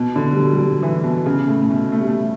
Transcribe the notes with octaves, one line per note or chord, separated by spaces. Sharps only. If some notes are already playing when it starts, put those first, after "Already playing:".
Already playing: B2
D3
G3
F#3
G3
F#3
E3
B2
C#3
A2
A2
B2
A3
G3
A3